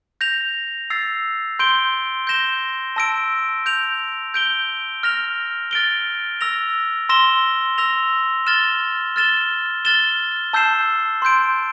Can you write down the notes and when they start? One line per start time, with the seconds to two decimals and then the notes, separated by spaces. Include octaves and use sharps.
0.21 G6 A#6 F7
0.90 E6 A6 C7
1.59 C6 G6 D7 G7
2.27 G6 A#6 E7 G7
2.96 A5 E6 A#6 D7
3.66 G6 D7 F7
4.34 G6 D7 G7
5.03 F6 A#6 F7
5.71 F6 A6 D7 G7
6.41 E6 A#6 F7
7.09 C6 E6 A#6 E7 G7
7.78 E6 A#6 F7
8.47 F6 A6 E7 G7
9.16 F6 A6 E7 G7
9.85 F6 A6 E7 G7
10.53 A5 E6 G6 C7 E7
11.22 C6 G6 D7